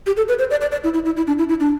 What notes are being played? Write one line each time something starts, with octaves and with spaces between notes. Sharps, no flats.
G4
A4
B4
C5
D5
D5
D5
E4
E4
E4
E4
D4
E4
E4
D4